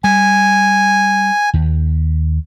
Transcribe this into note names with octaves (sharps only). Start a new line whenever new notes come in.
G3 G#5
D#2